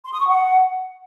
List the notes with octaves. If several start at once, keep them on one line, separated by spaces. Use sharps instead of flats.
C6
D#6
C#6
F#5